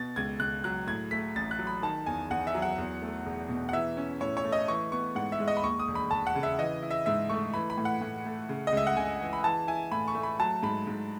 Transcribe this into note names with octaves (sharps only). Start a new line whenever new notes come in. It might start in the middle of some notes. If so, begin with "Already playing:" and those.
Already playing: B2 A6
C#2 G#6
C#2 F#6
F#3 F#6
A2 G#6
A3 B6
A1 A6
F#6
F#3
B5
D#3 A5
E2 G#5
E2 F#5
E5
F#3
F#5
E2
A3
E1
B2
F#5
E3 E5
C#4
A2 C#5
C#5
A3
D#5
E3 C#6
B3 C#6
G#2 F#5
E5
G#3
D#5
B5
D#2 C#6
D#6
E1
B5
E1 A5
F#5
C#3
E5
E3 D#5
E4
E5
G#2 E5
A3 C#6
E3 B5
B5
A2
F#5
A2
A3
C#3
D#5
C#2 E5
F#5
C#2 G#5
E3
B5
E3 A5
E4 G#5
A2 B5
C#6
A3
B5
F#3 A5
G#2 B5
G#2